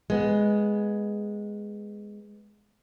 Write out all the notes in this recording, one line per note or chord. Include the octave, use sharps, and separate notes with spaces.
G#3 B3